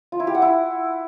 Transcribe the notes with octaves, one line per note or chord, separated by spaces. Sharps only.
F4
E4
G4
F#5
E4